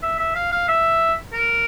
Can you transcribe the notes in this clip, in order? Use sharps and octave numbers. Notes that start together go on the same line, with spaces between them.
E5
E5
F5
F5
E5
A#4